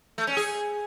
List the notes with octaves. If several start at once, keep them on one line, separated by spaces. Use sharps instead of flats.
A3
C#4
G#4